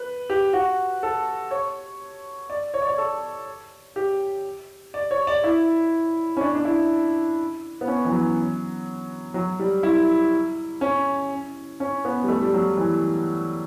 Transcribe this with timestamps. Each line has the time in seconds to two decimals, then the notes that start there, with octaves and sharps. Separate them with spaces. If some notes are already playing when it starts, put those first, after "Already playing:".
Already playing: B4
0.30 G4
0.53 F#4
1.03 A4
1.51 C#5
2.50 D5
2.74 C#5
2.82 D5
2.89 C#5
2.98 A4
3.96 G4
4.94 D5
5.11 C#5
5.27 D5
5.44 E4
6.37 C#4
6.41 D4
6.55 D4
6.65 E4
7.81 B3
7.88 C#4
8.05 E3
8.12 F#3
9.34 F#3
9.60 G3
9.83 E4
10.81 C#4
11.80 C#4
12.05 B3
12.24 G3
12.28 A3
12.42 G3
12.54 F#3
12.77 E3